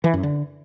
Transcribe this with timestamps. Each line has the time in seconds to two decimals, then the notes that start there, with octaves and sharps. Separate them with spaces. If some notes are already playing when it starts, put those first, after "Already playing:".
0.04 E3
0.14 F#2
0.23 D3